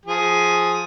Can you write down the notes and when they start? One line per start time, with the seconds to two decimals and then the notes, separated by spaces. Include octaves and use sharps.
0.06 F3 G#4